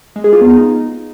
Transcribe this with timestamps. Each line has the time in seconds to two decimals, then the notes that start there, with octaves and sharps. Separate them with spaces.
0.16 G#3
0.24 G#4
0.33 F4
0.41 B3
0.50 D#4